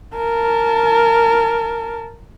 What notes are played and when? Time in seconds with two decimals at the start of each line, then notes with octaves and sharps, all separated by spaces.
0.15 A#4 A5